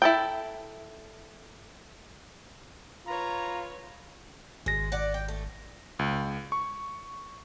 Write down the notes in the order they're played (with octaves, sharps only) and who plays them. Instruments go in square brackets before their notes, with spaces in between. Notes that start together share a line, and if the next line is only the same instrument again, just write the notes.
[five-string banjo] E4 A4 G5
[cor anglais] F4 [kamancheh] B4 C#5 [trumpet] A#5
[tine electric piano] G#1 A#6 [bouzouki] G#3
[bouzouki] D5 F#5
G5
A3
[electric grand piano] C#2
C#6